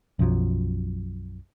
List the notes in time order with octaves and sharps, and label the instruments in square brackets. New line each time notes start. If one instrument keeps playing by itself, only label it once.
[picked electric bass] B1 F#2 F3 F#3